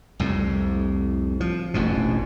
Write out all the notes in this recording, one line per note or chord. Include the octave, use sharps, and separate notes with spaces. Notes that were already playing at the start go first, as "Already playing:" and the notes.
C2 F2 A2
F3
E1 A1 F2 B2